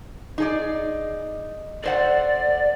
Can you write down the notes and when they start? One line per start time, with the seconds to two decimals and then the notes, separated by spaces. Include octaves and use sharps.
0.38 D#4 G#4 D5
1.83 A4 C5 D5 F#5